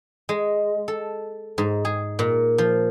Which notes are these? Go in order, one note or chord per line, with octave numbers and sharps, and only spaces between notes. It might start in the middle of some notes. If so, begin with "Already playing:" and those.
G#3
A4
G#2
G#4
A#2
F3